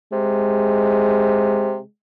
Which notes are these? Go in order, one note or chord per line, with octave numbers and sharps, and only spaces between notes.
C3 G#3